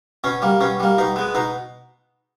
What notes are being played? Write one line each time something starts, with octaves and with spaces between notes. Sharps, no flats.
B2 C#4
G3 A#3
B2 C#4
G3 A#3
B2 D#4
G#3 B3
B2 D#4